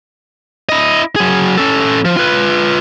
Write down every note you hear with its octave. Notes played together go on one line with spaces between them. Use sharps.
E4 D#5
F#3 G#4
C#4 A4
F3
F4 B4